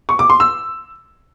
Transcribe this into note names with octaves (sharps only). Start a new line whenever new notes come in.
C#6
D6
C6
E6